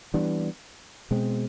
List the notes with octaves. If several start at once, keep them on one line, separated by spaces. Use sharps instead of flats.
E3 G3 B3 D4
B2 G#3 C4